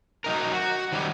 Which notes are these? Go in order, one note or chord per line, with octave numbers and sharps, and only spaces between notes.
F#3 D#4 A#4
F#4
D#3 F#3 G3